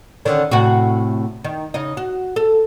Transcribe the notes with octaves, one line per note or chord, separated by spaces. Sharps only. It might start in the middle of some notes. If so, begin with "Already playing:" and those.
D3 D#3 C#4
A2 C3 F#4
D#3
C#3 D#4 D#5
F#4
A4